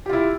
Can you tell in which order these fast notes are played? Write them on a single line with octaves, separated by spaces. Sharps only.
G4 F4 E4